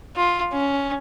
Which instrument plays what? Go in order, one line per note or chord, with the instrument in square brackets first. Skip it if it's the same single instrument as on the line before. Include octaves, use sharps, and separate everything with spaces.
[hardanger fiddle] F4
C#4